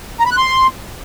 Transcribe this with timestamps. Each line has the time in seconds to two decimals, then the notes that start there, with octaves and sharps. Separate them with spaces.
0.20 A#5
0.26 B5
0.31 F#6
0.37 C6